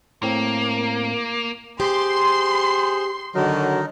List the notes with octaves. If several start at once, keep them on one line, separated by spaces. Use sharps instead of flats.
A2 A#3 C4
G4 G#4 C5 C6
D3 D#3 F#3 D#4 A#4 D#5